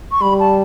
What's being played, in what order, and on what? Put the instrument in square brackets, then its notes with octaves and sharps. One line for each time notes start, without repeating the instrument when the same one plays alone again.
[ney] C#6
[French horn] G3 [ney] B5
[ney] A5